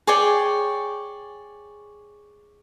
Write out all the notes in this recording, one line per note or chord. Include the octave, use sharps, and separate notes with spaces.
G#4 C#5 D5 G5